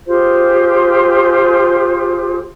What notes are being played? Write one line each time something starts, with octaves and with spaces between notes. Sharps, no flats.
F4 G4 G#4 C5